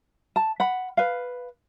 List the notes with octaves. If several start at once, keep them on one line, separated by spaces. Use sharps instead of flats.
A5
F#5 B5
B4 F5